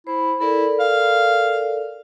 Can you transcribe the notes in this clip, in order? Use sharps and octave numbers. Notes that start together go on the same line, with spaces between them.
E4 C5
E4 A4 A#4 D5
F5